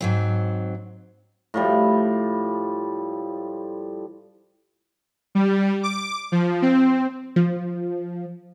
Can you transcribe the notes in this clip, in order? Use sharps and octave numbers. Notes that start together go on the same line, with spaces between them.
G#2 F#3 C4
A2 F3 G3
G3
D6
F3
C4
F3